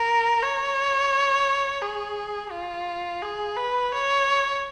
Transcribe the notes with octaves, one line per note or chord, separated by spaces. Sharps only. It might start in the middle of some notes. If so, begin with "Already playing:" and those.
Already playing: A#4
C#5
G#4
F4
G#4
B4
C#5